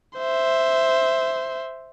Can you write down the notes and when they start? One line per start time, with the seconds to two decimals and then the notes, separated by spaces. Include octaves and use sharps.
0.18 C5 E5